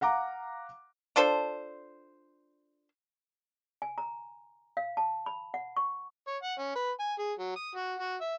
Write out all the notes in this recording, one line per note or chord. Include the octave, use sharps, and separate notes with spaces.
F5 F#5 A#5 D6
D4 F4 A4 C5
G#5
A#5
F5
A5
B5
F#5
C#6
C#5
F#5
C#4
B4
G#5
G#4
F#3
D#6
F#4
F#4
E5